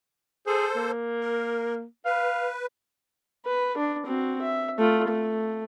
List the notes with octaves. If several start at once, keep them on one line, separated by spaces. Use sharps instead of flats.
G#4 A4 C5
A#3
A#4
B4 F5
B4
D4
C4 F#4
E5
A3 F4
A3